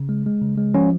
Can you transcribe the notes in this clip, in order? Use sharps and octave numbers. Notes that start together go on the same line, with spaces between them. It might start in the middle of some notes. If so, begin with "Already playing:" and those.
Already playing: C#3
G#3
G#3
C#3
G#3
F3 C#4